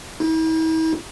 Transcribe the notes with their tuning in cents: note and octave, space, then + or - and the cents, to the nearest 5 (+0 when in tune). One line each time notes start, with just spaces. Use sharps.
E4 -45